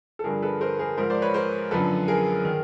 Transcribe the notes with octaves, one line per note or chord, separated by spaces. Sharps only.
A4
G2 D3 F3 G#4 A#4
A4 B4
A#4 C5
G#4 A#4
G#2 F3 A#4 C5
C5 D5
B4 C#5
A#4 C5
F#2 D3 F3 A4 B4
G#4 A#4
D#3